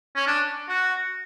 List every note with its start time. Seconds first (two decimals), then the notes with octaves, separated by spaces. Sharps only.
0.16 C#4
0.27 D4
0.69 F#4